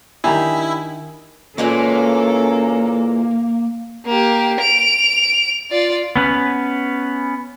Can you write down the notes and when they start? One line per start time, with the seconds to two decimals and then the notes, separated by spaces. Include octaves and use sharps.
0.24 D#3 D4 E4 G4 G#5 A#5
1.58 A#2 E3 G#3 A#3 C#4 A4
4.06 A#3 G4
4.60 D7 F7
5.71 F4 D5
6.16 B3 C#4 B4